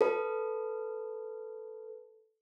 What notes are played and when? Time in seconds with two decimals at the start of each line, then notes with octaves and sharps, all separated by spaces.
0.01 A4 B4